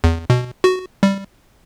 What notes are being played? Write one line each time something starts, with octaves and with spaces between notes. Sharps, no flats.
E2
B2
F#4
G3